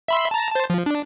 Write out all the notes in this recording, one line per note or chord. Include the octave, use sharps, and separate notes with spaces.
E5 B5 C6
A5 A#5
C5 A5
F3
D4